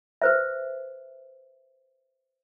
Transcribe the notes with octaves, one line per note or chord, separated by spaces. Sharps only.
B4 C5 E5